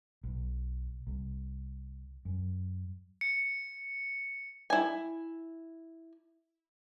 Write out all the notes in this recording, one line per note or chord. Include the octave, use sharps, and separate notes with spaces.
B1
C2
F#2
C#7
E4 G#5